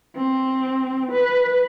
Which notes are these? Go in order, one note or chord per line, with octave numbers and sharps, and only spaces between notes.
C4
B4